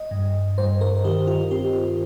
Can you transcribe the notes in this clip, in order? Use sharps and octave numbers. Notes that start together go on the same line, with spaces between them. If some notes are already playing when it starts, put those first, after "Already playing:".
Already playing: D#5
G2
G2 C5
A#4
A#4
D#3 G4
F4
C4 G4